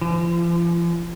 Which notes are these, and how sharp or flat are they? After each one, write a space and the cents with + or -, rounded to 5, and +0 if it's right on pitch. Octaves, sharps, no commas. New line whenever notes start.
F3 -40